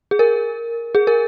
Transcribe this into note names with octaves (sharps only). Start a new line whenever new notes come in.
G#4
A#4
G#4
A#4